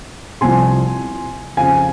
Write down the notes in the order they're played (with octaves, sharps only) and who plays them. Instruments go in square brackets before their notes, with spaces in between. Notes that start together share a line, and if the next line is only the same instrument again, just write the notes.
[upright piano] C2 C3 F3 G#5 C6
F2 C#3 F3 F5 G#5